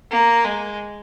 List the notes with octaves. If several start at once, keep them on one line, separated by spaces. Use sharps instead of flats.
A#3
G#3